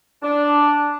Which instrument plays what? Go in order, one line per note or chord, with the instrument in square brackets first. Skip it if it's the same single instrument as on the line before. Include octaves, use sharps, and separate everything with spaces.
[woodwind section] D4